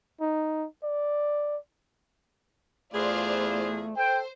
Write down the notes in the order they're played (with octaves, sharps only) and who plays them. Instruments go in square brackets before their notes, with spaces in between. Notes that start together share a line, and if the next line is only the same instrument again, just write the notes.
[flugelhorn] D#4
D5
[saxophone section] E2 G#4 [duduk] A3 [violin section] F4 C5 D5
[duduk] A4 [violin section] C5 [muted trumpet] G5